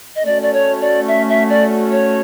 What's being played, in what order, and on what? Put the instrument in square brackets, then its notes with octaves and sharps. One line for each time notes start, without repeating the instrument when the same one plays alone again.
[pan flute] D#5
[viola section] A3 C#4 F#4 [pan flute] D5
[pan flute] D5
C#5
D5
E5
E5
D5
C#5